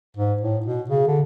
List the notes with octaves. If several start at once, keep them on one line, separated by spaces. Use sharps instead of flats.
G#2
A2
B2
C#3
D3